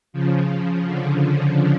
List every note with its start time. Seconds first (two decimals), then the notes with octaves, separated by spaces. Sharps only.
0.13 C#3 F3
0.86 D3